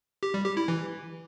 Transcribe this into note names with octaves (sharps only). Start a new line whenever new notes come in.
G4
G3
G4
E4
E3